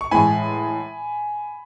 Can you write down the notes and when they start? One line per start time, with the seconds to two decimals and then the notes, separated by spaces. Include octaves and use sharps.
0.01 C#6
0.11 A2 E3 G#3 G#5 B5